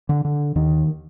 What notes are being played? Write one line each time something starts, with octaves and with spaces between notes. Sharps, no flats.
D3
D3
D#2 D#3